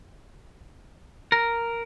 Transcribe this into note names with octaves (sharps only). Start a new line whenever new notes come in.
A#4